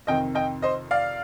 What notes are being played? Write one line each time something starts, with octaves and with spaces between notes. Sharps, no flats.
F2 C3 D#3 D#5 G5
D#5 G5
C5 D#5
D5 F5